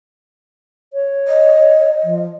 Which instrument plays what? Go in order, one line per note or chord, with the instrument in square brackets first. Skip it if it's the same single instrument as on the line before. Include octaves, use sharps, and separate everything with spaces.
[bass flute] C#5
[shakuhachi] D#5
[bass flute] F3